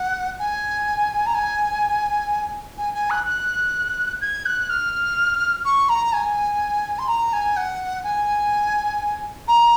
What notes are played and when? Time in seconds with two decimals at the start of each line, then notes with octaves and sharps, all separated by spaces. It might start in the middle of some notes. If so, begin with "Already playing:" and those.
Already playing: F#5
0.39 G#5
1.26 A#5
1.34 G#5
2.78 G#5
2.94 G#5
3.10 F#6
3.26 F#6
4.21 G#6
4.46 F#6
4.69 F6
5.65 C#6
5.89 A#5
6.13 G#5
6.99 C6
7.08 A#5
7.33 G#5
7.57 F#5
8.04 G#5
9.48 A#5